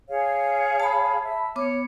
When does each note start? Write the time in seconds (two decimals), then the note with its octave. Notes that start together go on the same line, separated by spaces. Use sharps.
0.08 G#4 C#5 F5
0.80 A5 B5
1.23 E5
1.56 B3 C#5 D6